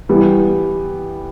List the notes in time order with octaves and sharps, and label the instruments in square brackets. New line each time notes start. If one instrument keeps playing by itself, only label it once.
[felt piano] E3 G3 B3 E4